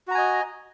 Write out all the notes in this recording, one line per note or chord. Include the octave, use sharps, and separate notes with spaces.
F#4 D#5 G#5 A#5